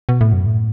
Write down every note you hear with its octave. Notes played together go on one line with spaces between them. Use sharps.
B2
A2
F#2
A2